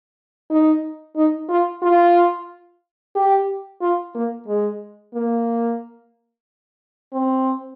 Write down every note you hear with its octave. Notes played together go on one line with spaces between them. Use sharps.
D#4
D#4
F4
F4
G4
F4
A#3
G#3
A#3
C4